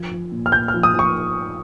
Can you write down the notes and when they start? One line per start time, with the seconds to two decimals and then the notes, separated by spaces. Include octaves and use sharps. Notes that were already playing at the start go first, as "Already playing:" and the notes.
Already playing: F3 G#6
0.11 F3
0.32 A#2
0.46 F6
0.52 A#2 G6
0.68 F6
0.74 F3
0.83 D#6
0.94 F3
0.99 C#6